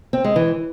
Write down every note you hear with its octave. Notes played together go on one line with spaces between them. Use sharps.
C4
G#3
E3